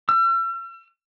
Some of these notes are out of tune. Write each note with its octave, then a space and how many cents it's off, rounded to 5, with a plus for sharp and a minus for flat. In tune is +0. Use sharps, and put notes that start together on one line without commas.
E6 +45